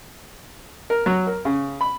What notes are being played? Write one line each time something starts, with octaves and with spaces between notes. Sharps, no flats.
A#4
F#3
A#4
C#3
B5